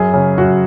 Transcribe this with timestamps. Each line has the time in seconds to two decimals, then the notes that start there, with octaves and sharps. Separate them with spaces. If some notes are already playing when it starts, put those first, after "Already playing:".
Already playing: F#2 G#4
0.13 C#3
0.38 F#2 F#4